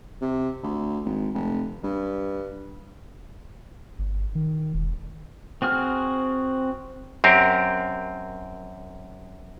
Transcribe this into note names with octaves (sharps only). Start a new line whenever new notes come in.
C3
D2
G#1
F1
G2
G1
D#3
E1
C4 F#4 G#4 F6
F#2 C4 G4 A#4